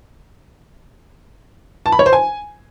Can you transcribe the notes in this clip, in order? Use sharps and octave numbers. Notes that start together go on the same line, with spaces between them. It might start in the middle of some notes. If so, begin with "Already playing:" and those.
A5
B5
C#5
C5
G#5